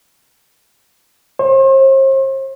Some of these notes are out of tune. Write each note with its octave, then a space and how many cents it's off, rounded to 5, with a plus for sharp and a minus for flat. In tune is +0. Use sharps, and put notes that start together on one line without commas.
C5 +40